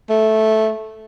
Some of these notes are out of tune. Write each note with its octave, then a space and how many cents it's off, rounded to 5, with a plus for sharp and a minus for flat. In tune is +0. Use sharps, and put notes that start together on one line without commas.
A3 -10